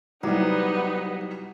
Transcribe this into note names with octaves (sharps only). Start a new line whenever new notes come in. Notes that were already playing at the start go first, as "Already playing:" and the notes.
C2 F#3 G3 B3 D#4